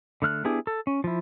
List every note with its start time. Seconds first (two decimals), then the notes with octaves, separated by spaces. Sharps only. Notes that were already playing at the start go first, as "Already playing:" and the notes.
0.22 D3 A3 F6 F#6
0.45 B3 D4 E4 G4 G#4
0.67 A4
0.87 C#4
1.04 F3 E4